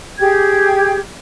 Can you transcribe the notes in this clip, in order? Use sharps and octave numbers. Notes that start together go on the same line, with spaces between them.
G4 G#4 G5 G#6